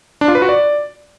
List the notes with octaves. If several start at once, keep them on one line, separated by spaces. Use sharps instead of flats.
D4
F4
B4
F#4
D5